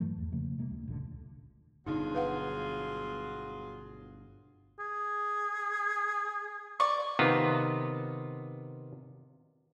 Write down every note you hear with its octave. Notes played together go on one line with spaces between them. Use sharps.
G2 E3 F#3 A3
E2
C#3 F3 A3 A#3
C3 G#3 A#3
D2 D3
F1 C#2 A#2 D3
G1 B2 D3 F#3 D#4 F4 G#4
B4 F5 F#5
G#4
D5 C#6
C3 D#3 B3 F4